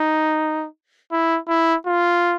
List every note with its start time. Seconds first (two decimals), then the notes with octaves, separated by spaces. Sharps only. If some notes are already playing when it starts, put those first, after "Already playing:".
Already playing: D#4
1.12 E4
1.49 E4
1.87 F4